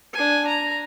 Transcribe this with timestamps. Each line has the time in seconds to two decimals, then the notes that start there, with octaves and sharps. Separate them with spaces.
0.13 D4 G#5
0.47 A#5